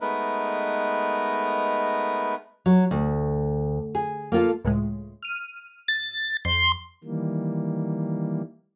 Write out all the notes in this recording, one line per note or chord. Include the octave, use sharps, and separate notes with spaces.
G#3 A3 B3 D#4 A#4 B4
F#3
D2
G#4
A#3 F4 A4
C#2 A2 G#3
F6 D#7
A6
F2 C6
D#3 E3 G3 A#3